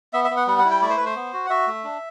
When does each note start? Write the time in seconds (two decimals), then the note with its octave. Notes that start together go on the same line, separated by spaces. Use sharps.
0.13 B3 E5
0.24 E5
0.31 B3
0.37 F#5
0.47 G3 F#5
0.58 F#5
0.65 E4
0.70 G5
0.82 A3 D5
0.90 C5
0.97 B4
1.00 A3
1.05 C5
1.16 B3
1.33 F#4
1.46 F#5
1.50 F#4 E5
1.67 A3
1.84 D4